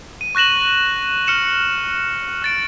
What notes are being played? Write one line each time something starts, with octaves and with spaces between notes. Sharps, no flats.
D#7
C#6 F#6 A#6 E7 F#7
F6 C#7 E7
F6 A6 D7